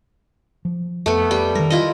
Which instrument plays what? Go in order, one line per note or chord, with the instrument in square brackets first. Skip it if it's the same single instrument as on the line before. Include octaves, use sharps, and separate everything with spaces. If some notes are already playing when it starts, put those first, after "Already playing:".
[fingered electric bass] F3
[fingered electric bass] F2 [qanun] A3 B3
[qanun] G3 G5
[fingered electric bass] D#3 G3 [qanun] A#4
[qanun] E4 F4 D#5